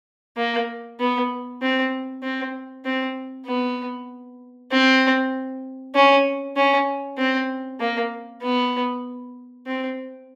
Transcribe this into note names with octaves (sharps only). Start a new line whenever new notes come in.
A#3
B3
C4
C4
C4
B3
C4
C#4
C#4
C4
A#3
B3
C4